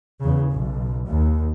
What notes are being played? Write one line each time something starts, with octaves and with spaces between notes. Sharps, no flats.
E2 C#3
B1
D#2